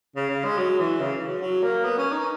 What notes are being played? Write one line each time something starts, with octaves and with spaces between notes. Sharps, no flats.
C#3
C#3
G#3
F#3
E3
C#3
F#3
F#3
A#3
B3
C#4
D#4